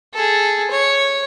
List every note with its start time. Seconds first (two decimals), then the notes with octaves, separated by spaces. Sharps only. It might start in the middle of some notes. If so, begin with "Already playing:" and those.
0.14 G#4 A4
0.70 C#5